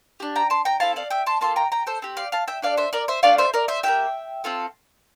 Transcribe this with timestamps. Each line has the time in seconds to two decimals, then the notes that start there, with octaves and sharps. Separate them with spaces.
0.20 D4 G4
0.36 G5 A#5
0.50 A5 C6
0.65 G5 A#5
0.80 C4 E4 A4 F5 A5
0.96 D5 F5
1.10 E5 G5
1.26 A5 C6
1.41 A#3 F4 A4 A5 C6
1.56 G5 A#5
1.72 G5 A#5
1.87 A4 C5
2.02 C4 G4
2.17 D5 F5
2.32 F5 A5
2.48 E5 G5
2.62 D4 A4 D5 F5
2.77 C5 E5
2.93 A#4 D5
3.08 C5 E5
3.23 A3 D4 F4 D5 F5
3.38 C5 E5
3.54 A#4 D5
3.68 C5 E5
3.83 A#3 E4 G4 E5 G5
4.44 C4 F4 A4